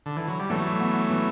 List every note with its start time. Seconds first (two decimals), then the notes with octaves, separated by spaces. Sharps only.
0.06 D3
0.17 E3
0.28 F#3
0.39 G3
0.50 E3 F#3 A3
0.80 B3
1.10 E3